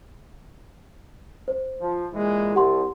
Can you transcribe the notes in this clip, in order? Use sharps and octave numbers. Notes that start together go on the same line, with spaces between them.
C5
F3
A#2 E3 G#3
C2 G4 F#5 C6